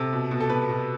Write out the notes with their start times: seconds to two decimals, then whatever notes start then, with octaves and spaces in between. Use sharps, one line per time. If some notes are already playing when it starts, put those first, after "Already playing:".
Already playing: C3 A4
0.13 B2
0.31 B2
0.40 A4
0.49 B2 B4
0.69 B2